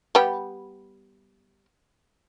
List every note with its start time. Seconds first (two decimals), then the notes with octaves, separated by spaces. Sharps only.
0.15 G3 B3 G4